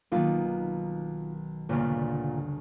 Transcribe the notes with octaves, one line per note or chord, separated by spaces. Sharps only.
B1 D#3 A#3 F4
G1 D2 A#2 C#3